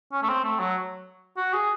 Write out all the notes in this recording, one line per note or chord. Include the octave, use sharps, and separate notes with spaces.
C#4
A3
C4
A3
F#3
F#4
G#4